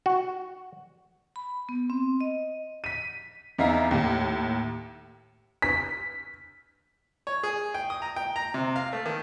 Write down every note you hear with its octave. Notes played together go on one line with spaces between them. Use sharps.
F#4
B5
B3
C4
D#5
B6 D#7
E2 D#4 E5 F5 A#5
D#2 A2
B6
C#5
G#4
G5
D#6
A#5
G5
A#5
C3
F5
A3
D#3